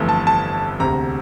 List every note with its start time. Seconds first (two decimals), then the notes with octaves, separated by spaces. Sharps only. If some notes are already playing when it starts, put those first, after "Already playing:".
Already playing: G1 F2 E3 A3
0.09 A5
0.27 A5
0.80 E1 D2 C3 A#5